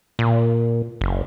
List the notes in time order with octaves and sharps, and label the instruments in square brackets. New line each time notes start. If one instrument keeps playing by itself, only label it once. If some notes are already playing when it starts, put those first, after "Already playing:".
[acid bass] A#2
F#1